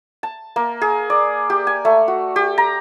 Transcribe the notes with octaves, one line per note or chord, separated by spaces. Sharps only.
A5
A#3
G#4
D5
G4
G#5
A3
F#4
G4
A#5